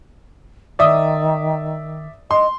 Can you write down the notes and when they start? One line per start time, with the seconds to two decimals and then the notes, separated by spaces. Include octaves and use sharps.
0.79 D#3 D5 E5 D#6
2.31 D#5 C6